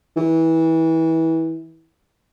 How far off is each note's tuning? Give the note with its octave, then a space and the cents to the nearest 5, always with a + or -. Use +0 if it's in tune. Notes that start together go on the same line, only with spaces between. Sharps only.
E3 -25